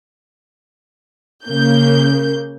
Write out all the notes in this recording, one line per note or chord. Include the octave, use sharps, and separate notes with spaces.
C#3 A#3 G6